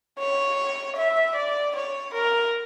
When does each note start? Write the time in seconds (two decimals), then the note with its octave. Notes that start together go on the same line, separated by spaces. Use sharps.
0.19 C#5
0.96 E5
1.36 D5
1.76 C#5
2.14 A#4